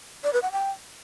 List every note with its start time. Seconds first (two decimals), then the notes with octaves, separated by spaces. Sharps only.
0.24 D5
0.33 B4
0.43 F#5
0.52 G5